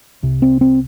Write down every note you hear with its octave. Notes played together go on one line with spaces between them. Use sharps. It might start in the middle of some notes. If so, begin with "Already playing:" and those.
C2 C3
C4
C4